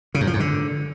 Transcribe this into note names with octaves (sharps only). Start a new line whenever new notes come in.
C#3
F#2
F3
G#2
D3